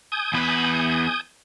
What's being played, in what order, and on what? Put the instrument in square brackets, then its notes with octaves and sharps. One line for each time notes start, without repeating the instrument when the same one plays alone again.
[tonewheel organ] G#5 D#6 G6
[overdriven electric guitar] E2 B4